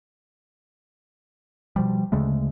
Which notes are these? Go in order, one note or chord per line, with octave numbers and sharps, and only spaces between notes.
B2 F3 G3
D2 C#3 G#3 A3